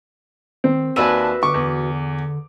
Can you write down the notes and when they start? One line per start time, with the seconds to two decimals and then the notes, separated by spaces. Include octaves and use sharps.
0.64 D#3 C4
0.96 D#2 F#4 B4 D5 E5 G#5 A5
1.43 D3 C#6 D6
1.54 E2